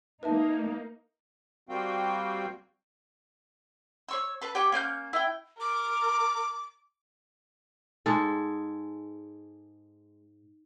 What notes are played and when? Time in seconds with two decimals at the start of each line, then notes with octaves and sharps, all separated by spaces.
0.23 A#3 D#4 B4 E5 A5
1.69 G3 A#3 C4 F#4 F5 G5
4.08 C#5 C#6 E6
4.41 A4 B4
4.55 G4 C#5 G5 D6
4.72 A#3 C#4 G#5 G6
5.13 E4 G5
5.61 A#4 D6
8.06 G#2 G#3 G#4 A4